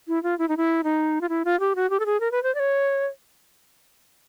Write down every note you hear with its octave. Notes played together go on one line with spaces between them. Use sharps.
E4
F4
E4
D#4
E4
D#4
F4
E4
F4
G4
F#4
G4
A4
G#4
A#4
B4
C5
D5
C#5